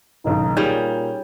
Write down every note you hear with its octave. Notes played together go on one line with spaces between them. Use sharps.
F#1 B1 D#3 D#4
A#2 G3 C#4 D#4 G#4 G6 F7 F#7